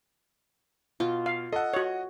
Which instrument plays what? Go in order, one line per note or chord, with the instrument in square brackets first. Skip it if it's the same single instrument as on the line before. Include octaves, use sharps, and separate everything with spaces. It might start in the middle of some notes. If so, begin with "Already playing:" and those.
[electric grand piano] B2 [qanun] F4
[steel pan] F5
[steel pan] A4 [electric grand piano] D#5 F#5
[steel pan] F#4 C#5